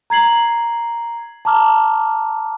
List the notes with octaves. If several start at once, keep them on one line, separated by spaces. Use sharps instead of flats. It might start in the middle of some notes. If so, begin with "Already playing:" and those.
A#5 G#6 C7 F#7
A5 A#5 D6 F6